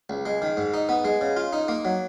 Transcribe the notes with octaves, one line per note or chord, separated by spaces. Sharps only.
C#2
G#3
D#3
G#2
D#4
B3
G#3
C#3
F4
D#4
A#3
F#3